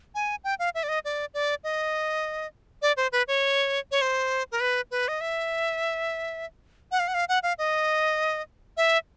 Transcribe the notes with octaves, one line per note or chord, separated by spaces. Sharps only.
G#5
G5
F5
E5
D5
D#5
D5
D5
D#5
D5
C5
B4
C#5
C#5
C5
A#4
B4
B4
D#5
E5
F#5
F5
F#5
F5
F#5
F5
D#5
E5